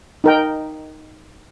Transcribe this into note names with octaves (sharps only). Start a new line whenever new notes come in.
D#4 A#4 G5